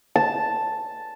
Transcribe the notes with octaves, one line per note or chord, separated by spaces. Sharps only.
A5